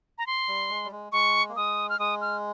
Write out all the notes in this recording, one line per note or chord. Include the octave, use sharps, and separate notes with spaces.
A#5
C6
G3
G#3
G3
G#3
G#3 C#6
A#3
G#3 D#6
F6
G#3 D#6
F6